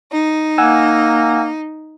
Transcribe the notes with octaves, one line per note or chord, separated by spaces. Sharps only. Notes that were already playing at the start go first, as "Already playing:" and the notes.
D#4
A#3 F#5 G#5 E6